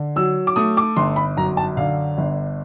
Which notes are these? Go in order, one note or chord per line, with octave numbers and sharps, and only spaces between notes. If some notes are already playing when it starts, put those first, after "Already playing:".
Already playing: D3
F#3 E6
D6
A3 D#6
D6
G1 C6
B5
F#2 A#5
A5
D3 F5
G1